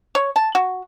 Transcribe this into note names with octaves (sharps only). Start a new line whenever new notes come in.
C#5
A5
F#4